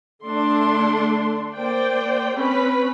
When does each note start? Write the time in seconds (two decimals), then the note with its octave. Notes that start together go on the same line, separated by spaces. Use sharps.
0.25 D3 A3 D4 C6
1.54 A#3 C5 D5 G5
2.36 C4 C#4 B4 B5